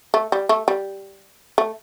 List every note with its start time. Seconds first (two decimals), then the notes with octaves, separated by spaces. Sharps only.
0.14 A3
0.32 G3
0.49 A3
0.68 G3
1.58 A3